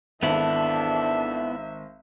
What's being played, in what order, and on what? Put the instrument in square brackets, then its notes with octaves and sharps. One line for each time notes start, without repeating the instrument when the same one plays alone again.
[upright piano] G#1 [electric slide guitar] B3 E4 [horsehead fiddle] D4 A4 [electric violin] E5